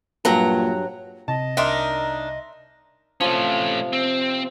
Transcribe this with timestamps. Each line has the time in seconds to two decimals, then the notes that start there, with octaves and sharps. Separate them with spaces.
0.25 G2 A#2 F#3 A#5
1.28 C3 D#5 A5
1.57 C2 D4 D#4 A#4 E5 C6
3.21 C3 F3 A3 C#4
3.93 C4